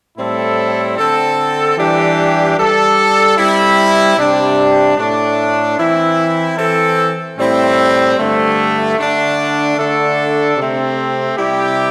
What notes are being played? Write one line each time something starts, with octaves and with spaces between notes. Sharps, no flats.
A2 G3 C4 E4 A4
D3 C4 A4
E3 G3 D4 G4
G3 D4 A4
G3 C4 E4
C3 G3 D4 G4
A2 A3 D4
E3 C4 E4
E3 C4 A4
A2 G3 C4 E4
G2 D3 A3
D3 A3 D4
D3 A3 D4 A4
C3 A3 C4
C3 G3 E4 G4